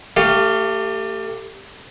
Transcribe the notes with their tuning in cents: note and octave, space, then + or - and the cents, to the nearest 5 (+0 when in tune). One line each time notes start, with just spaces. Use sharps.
A3 +30 G4 +0 F5 +0